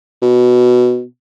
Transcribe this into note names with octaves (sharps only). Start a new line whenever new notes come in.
B2